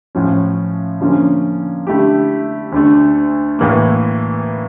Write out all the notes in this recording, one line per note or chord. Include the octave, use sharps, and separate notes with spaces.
A2 F3 C#4
D3 F3 A#3 C#4
D3 A3 E4 G4
D2 D3 A3
A2 E3 A#3